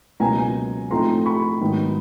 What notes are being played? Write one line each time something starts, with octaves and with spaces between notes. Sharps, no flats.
C#2 B2 F#3 A#3 G#5 A#5
A2 F3 A3 C4 D#4 A#5 C6
B5 C#6
G#2 D#3 F#3 B3